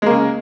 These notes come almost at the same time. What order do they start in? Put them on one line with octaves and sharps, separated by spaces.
G#3 A#3 C#3